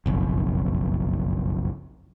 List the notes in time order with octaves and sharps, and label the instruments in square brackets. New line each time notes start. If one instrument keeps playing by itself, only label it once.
[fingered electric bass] F#1 B1 F2